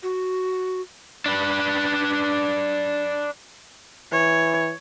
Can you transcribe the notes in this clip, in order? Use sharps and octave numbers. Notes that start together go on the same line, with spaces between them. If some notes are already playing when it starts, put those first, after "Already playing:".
F#4
D4 B4
E3 C#5